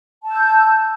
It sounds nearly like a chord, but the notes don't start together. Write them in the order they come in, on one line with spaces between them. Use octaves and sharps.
A5 E6 G6